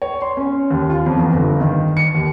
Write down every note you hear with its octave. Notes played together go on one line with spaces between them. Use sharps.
C#5
C6
C#4
D#2
F4
F2
E2
G1
D#3
C#7
D#2